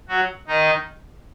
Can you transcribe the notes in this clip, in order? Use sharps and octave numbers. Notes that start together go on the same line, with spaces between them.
F#3 F#4
D#3 D#4